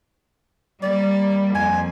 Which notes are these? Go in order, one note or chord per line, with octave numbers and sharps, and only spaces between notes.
G3 A#3 D5
F2 G#5